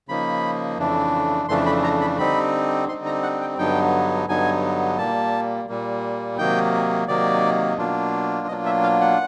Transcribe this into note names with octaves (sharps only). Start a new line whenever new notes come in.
C#3 F3 A#3 D#4 B5
F2 C#3 E3 A3 D4
F2 C#3 E3 A3 D4 C6
B5
A#5
B5
D3 G3 C4 D#4 B5
D3 G3 C4 D#4 C6
A#5
F#5
G5
G2 D3 F#3 B3 D#4 G5
G2 D3 F#3 B3 D#4 G#5
A#2 G3 A#3 A5
A#2 G3 A#3
C3 D#3 F#3 A#3 D#4 G5
C3 D#3 F#3 A#3 D#4 D5
B2 F#3 A#3 D4 F4
B2 F#3 A#3 D4 F4 D#5
E5
F5
F#5